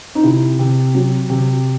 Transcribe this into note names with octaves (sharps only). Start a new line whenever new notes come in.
D#4
C3 E4
C3
F#3
C3